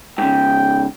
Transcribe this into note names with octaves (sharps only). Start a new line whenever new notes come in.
G#2 C#3 G5